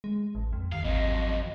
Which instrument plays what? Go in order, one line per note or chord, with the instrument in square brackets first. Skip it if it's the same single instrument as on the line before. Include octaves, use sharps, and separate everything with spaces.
[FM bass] G#3
A1
F2
[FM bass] D#2 [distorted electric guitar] F5
[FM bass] G#1 [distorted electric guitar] F2 F#3 [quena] D#5